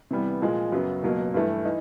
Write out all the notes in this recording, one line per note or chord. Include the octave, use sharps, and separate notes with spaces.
C3 E3 G3 B3
A#2 F3 G#3
F#2 C#3 F#3 B3
C#2 B2 F#3 A#3
G2 E3 A3
E3 D#4